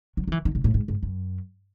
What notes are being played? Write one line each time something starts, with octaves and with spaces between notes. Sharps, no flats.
F#3
F#3
E3
D#3
B2
A2
G#2
G#2
F#2